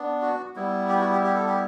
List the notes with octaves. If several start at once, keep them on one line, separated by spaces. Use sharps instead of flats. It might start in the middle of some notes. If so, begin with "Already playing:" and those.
Already playing: B3 D4
F#4
G3 B3 E4
G4
F#4
G4
G4
A4
G4